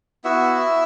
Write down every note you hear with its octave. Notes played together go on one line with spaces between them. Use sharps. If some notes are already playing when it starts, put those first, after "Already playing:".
B3 E4 F#4 E5